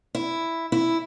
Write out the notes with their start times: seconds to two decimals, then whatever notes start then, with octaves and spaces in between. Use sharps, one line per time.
0.15 E4
0.72 E4